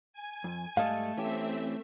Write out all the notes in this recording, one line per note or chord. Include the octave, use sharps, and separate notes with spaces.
G#5
F2
G#2 G3 A3 A4 D#5 F5
E3 C4 C#4 G4 E5